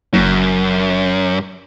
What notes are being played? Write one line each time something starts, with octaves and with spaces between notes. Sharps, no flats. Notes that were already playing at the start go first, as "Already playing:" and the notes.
F#1 F#2